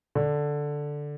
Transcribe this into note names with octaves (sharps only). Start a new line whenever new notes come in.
D3